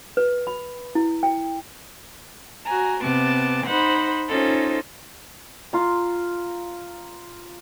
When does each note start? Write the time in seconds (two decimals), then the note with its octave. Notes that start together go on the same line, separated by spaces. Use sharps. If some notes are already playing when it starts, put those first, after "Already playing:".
0.17 B4
0.47 B5
0.95 E4
1.23 G5
2.64 F#4 G#5 A#5
3.00 C3 B3 A5 D6
3.66 D#4 C5 F#5 B5
4.27 C#4 D#4 F4 A4 C5
5.73 F4 A#5